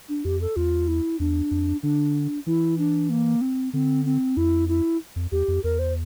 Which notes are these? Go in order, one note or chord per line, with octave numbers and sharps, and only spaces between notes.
D4
F2 G4
A4
E2 F4
E4
E2 D4
F2
D3 D4
E3 E4
D4
A#3
C4
D3 C4
C4
F2 E4
E4
F2
E2 G4
F2
E2 A#4
C5